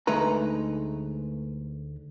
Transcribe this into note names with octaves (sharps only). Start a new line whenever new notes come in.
D2 G#3 A3 D#4 B4 A#5